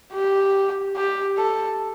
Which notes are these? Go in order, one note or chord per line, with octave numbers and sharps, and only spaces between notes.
G4
G4
A4